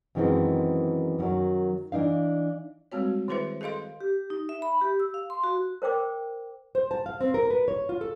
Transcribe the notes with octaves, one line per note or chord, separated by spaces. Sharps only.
F#2 D#3 E3 G#3 C4 D#4
F#2 D3 D#3 F#3
E3 D4 D#4 F5
G3 G#3 C4 F#4 C#5
D#3 E4 G#4 B4 C5 E5
G#4 A4 D#5 F5 C6
G4
D#4
E5
B5
G4
E6
F5
C6
F#4
A#4 C5 G5 D6
C5
A5
F5
C4
A#4
B4
C#5
F4
A4